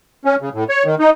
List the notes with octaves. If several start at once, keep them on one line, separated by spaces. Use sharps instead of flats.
C#4
C#3
A2
C#5
D#3
D#4